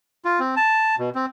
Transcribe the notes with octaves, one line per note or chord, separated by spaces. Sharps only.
F4
C4
A5
B2
C4